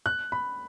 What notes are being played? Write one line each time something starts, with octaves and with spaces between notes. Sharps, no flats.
F#6
B5